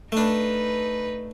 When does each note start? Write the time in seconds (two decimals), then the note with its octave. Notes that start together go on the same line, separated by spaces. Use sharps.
0.12 A3 D4 D#4 B4